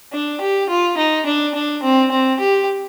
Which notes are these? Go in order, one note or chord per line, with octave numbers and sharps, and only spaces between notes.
D4
G4
F4
D#4
D4
D4
C4
C4
G4